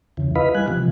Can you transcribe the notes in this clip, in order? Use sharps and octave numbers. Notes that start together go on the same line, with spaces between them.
F2 C#3 E3
E4 B4 D#5 F5 B5
G3 G#5 F#6
C3 E3 F3